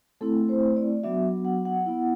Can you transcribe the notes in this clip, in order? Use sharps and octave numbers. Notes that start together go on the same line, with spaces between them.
A3 C4 E4 A4
C5
D5
F#3 B3 D4 F#4 E5
F#5
F#5
B3 E4